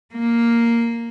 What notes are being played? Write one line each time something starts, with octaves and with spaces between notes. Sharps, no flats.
A#3